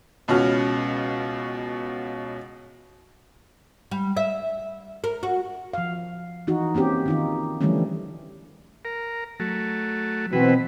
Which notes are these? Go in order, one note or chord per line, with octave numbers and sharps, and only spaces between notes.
C#2 B2 C#4 F#4 F6
G3
E5
A#4
F#4
F3 F5
E3 D#4 F#4
A#3 C4 C#4 G4
D#3 D#4 F4
D3 E3 F3 G3 A3 C#4
A#4
F#3 A3
B2 E3 C4 B4